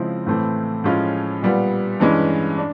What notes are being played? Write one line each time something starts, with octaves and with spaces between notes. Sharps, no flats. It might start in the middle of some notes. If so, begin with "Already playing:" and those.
Already playing: C#3 F3 G#3 C4 E4
A2 E3 A3 C4
A2 F3 G#3 C#4 F4
A#2 G3 B3
G2 E3 G#3 C#4
D4